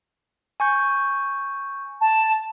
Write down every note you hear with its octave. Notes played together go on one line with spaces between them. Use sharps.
G#5 C#6 G6
A5